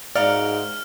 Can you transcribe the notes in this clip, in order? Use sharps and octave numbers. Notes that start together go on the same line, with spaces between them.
G#2 F#4 A#4 D5 F5 F6